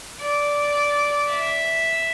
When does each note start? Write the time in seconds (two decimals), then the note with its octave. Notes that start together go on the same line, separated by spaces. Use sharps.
0.21 D5
1.28 E5